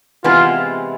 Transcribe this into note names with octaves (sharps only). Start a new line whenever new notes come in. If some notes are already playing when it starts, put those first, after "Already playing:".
C3 E3 G#3 B3 F4